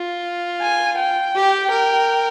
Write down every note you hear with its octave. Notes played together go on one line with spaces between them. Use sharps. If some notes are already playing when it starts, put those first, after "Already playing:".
Already playing: F4
G#5
G5
G4
A#4